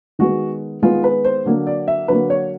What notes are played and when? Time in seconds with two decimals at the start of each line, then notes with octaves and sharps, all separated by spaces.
0.19 D#3 G#3 B3 F#4
0.82 D#3 G#3 B3 F4
1.04 B4
1.25 C5
1.46 D3 F#3 A#3
1.67 D5
1.88 E5
2.08 D3 F#3 A#3 B4
2.30 C#5